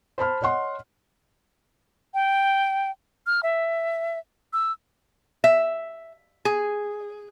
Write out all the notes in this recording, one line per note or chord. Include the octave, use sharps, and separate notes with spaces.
C5 A5 B5 F6
C#5 D#5 F#5 C6
G5
F6
E5
E6
E5
G#4